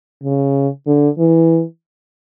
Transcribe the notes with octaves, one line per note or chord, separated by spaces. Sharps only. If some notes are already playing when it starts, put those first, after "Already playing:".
C#3
D3
E3